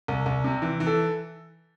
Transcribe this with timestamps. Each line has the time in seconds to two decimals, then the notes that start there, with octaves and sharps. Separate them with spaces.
0.08 C2
0.26 C2
0.44 C3
0.62 E3
0.80 E3
0.86 A4